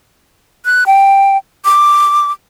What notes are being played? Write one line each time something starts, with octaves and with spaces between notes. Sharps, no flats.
F#6
G5
D6